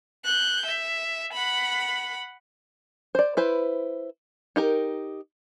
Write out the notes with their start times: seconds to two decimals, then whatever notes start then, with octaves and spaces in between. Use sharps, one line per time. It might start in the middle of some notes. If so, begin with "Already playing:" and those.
0.25 F#6 G6
0.66 E5
1.33 F#5 B5
3.15 C5 D5
3.37 E4 B4 C5
4.56 D#4 G4 A#4